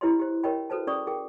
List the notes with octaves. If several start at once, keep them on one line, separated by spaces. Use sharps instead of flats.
E4 G4 B4 C#5 D#5 C6
G4 C5
G4 A#4 C#5 D#5 G5 B5
F#4 A4 B4 C5 A5
C#4 G#4 D5 B5 C#6 D#6
G#4 A#4 G5